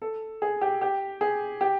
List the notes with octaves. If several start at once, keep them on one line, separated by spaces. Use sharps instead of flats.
A4
G#4
G4
G4
G#4
G4